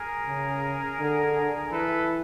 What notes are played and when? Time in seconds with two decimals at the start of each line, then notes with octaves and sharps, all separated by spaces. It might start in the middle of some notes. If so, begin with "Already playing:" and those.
Already playing: G#4 A#4
0.26 C#3
0.99 D3
1.72 E3 A4 B4